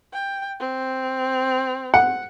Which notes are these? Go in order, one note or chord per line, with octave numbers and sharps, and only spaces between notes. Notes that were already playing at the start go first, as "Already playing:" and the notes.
G5
C4
F#5